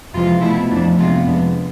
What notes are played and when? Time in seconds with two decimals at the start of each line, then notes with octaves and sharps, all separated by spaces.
0.14 F2 C3 E3 G#3 F4
0.42 B2 A3 E4
0.71 F2 E3 A3 D4
0.98 C3 G#3 B3 F4
1.26 F2 C3 G#3 B3 D4